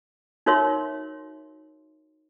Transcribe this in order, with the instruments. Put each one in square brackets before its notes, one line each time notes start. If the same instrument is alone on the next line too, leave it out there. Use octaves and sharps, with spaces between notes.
[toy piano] D#4 F#4 A#4 C#5 E5 C6